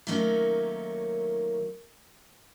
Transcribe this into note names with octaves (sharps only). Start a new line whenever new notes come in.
D#3 F#3 A3 A#3 C#4 D#4